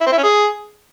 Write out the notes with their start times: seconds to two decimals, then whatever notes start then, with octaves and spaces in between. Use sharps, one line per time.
0.01 E4
0.06 C4
0.12 E4
0.18 C#4
0.23 G#4